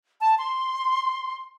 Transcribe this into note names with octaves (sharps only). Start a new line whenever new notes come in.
A5
C6